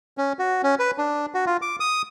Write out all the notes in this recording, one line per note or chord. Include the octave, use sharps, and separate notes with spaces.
C#4
F#4
C#4
B4
D4
F#4
F4
D6
D#6